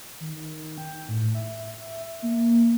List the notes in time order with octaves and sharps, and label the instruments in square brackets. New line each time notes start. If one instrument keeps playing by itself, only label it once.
[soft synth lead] D#3
G5
A2
E5
A#3